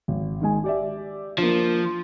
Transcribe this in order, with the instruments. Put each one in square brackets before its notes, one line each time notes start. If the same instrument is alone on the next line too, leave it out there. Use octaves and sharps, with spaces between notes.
[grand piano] G#1
D#3 G#3 G#5
G4 D5 E5
[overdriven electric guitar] F3 [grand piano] A#3 D4